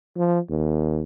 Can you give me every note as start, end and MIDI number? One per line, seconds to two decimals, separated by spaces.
0.17 0.39 53
0.50 1.03 39